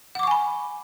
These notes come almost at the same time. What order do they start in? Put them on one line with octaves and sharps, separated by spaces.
F#5 D6 C#6 G#5 B5